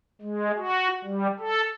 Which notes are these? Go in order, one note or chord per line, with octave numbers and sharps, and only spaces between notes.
G#3
F#4
G3
A4